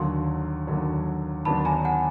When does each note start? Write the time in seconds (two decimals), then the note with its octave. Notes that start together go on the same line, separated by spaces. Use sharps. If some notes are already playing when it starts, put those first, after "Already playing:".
Already playing: D#2 D3 F#3 C6
0.67 D#2 D3 F#3
1.45 D#2 D3 F#3 B3 D4 A5 B5
1.65 G#5 A#5
1.85 F#5 G#5